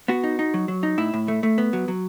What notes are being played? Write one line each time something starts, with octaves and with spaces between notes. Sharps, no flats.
B3 F#4
D#4
D#4
F#3
F#3
D#4
A2 E4
A2
A3
A3
B3
F#3
F#3